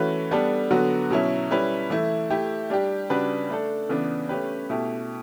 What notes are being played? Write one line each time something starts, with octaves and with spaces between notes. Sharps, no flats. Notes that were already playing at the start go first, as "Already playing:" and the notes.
Already playing: E3 A3 C#4 F#4 B4
G3 B3 D4 A4
D3 F#3 B3 F#4
B2 F#3 C#4 E4
G3 C#4 E4 B4
E3 A3 E4
A3 E4 G4
G3 D4 G4
C#3 G3 D4 F#4 B4
A3 D4 A4
C#3 E3 B3 D4
A3 C#4 G4 B4
B2 A3 E4 G4